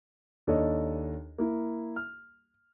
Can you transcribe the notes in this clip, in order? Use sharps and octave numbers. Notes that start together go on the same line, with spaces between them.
D#2 D4 A4 C#5 D#5
A#3 E4
F6